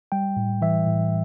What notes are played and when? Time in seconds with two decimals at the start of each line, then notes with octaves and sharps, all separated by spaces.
0.12 G3 G5
0.37 A2
0.62 E3 E5
0.87 A2